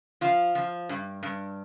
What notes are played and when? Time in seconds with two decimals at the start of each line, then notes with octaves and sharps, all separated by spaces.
0.21 F3 F4
0.55 F3
0.89 G2
1.23 G2